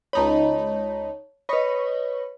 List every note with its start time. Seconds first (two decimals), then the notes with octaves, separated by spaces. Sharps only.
0.13 C#2 D#4 C#5 A5 B5
1.49 B4 C#5 D#5 B5 C#6